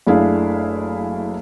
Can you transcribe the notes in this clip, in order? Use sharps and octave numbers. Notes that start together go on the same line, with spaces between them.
F#1 A3 D4 E4 G#4 F5